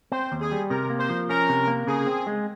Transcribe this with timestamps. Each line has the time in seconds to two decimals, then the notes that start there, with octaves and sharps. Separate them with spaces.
0.12 C4 C5
0.32 D#2
0.41 G#4
0.52 G3
0.70 C3 A#4
0.90 A#3
0.99 C5
1.09 F3
1.29 C#4 A#4
1.49 C3
1.67 A#3
1.87 C#3 G#4
2.06 C4
2.27 G#3